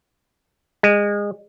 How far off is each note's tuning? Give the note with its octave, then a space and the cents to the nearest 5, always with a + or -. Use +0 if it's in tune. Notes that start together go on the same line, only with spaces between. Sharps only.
G#3 -25